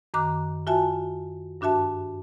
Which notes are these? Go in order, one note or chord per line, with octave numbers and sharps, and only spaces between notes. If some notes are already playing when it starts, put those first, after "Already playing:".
F#2 D#3 A#5 D6 F#6
F4 F#4 E5 G#5 A5
G2 D4 F#4 E5 A5